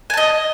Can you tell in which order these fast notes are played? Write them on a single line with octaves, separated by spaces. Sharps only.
G#5 A5 D#5